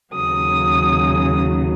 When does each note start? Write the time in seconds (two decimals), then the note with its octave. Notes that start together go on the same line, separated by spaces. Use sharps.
0.14 D#2 C#3 F#3 D#6